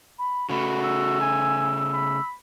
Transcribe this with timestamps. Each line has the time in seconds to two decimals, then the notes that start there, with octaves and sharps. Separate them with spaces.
0.18 B5
0.50 C#3 A3 F#4 B5
0.82 E6
1.21 G#5
1.94 B5